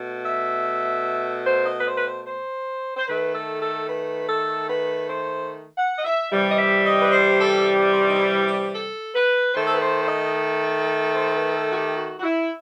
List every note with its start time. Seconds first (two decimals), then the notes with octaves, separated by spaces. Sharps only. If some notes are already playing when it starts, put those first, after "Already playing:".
Already playing: B2 A3
0.26 E5
1.46 C5
1.66 D#5
1.80 B4
1.87 C5
1.97 B4
2.07 C5
2.27 C5
2.97 C5
3.08 D#3 A3 B4
3.35 A4
3.62 A4
3.88 B4
4.28 A4
4.69 B4
5.09 C5
5.78 F#5
5.96 D#5
6.05 E5
6.30 C3 E3 G3
6.52 D#5
6.58 E5
6.86 D#5
7.00 B4
7.12 C5
7.38 A4
7.93 C4
8.09 D#4
8.20 E4
8.46 G4
8.74 A4
9.14 B4
9.54 D#3 A3 C5
9.67 A4
9.74 B4
9.82 C5
10.03 C5
10.08 D#5
11.15 C5
11.36 B4
11.57 A4
11.72 F#4
11.77 G4
11.97 F#4
12.20 F#4
12.23 E4